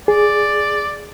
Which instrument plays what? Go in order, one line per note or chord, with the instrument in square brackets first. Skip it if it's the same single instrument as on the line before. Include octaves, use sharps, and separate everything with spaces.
[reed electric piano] G#4 [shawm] D5